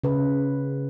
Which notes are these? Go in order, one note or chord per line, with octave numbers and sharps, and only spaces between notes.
C#3 B4